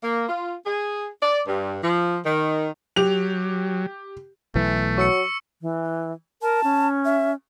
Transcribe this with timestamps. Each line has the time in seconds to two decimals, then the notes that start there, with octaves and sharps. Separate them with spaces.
0.03 A#3
0.29 F4
0.66 G#4
1.23 D5
1.47 G2
1.83 F3
2.25 D#3
2.96 F#3 G4 F7
4.55 B1 E3 A3
4.98 F#3 C#6 E6 C#7
5.62 E3
6.42 A#4 A5
6.64 C#4
7.05 E5